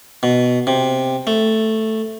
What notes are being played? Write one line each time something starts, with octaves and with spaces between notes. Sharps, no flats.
B2
C3
A3